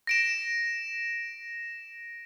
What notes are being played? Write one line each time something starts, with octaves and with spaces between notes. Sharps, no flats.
A#6 D7 E7